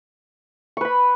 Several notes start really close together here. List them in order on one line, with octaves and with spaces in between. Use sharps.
C#6 B4 B5